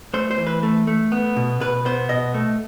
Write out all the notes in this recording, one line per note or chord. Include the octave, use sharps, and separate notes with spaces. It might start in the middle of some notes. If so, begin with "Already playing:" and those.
A3 C5
C5
E3
B4
A3
A3
B3
B2
B2 B4
B3 C5
B2 D#5
A3